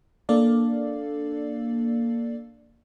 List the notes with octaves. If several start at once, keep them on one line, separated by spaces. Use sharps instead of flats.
A#3 D4 A4 D5 F5